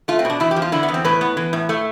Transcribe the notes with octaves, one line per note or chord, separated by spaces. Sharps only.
A3 F4
C4
B2 D4
E2 E4
G4
F3
F4
D3 E4
B3
E2
C4
A2 B4
B3
E3
A2
A3